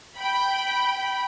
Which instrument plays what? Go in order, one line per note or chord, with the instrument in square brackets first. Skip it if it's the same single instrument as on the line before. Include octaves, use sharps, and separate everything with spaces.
[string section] G5 B5